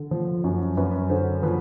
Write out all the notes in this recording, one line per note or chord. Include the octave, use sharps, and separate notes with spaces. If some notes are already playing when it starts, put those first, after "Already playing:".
Already playing: D3
F3
F#2
F#2 B4
D3 C5
F3 B4